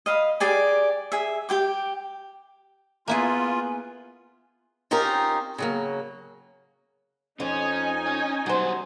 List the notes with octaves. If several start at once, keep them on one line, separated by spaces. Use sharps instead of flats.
D#5 F5 B5
G4 G#4 D5 G#5
G#4 E5
G4 G5 D6
A#3 B3 E4 F4 G#4 G#5
C4 C#4 D#4 F4 G4 A#4
C#3 F#3 A#3
F2 C#4 D#4 G#5
C#4 C#5
F#3 G3 C5 F#5